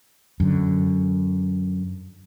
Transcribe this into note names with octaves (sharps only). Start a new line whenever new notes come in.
F#2 D3